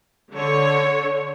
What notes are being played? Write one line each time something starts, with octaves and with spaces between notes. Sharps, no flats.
D3 C#5